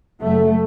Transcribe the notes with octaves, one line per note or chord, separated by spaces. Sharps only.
F#1 F#2 A3